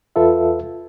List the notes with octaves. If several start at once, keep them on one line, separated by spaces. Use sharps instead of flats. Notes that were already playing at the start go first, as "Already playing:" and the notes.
E2 F4 A4 B4 E5